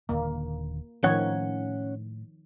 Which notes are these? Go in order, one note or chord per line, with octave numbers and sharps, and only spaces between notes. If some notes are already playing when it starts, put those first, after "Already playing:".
D#1 D#2 D3 A#3
A2 D#3 F3 C#4 C#5 F#5